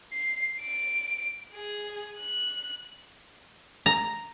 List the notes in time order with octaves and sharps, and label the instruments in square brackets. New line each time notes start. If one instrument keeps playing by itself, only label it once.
[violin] C7
D7
G#4
F#6
[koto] A#5